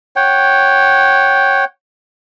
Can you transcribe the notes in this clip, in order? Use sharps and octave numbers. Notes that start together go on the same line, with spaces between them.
C#5 F#5 G5